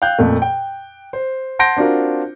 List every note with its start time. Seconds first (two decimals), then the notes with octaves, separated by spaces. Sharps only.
0.02 F5 G5 F#6 G6
0.19 F2 A#2 A3
0.42 G5
1.13 C5
1.59 F#5 A5 C6 G6 A#6 D7
1.77 C4 D4 F4 F#4 A#4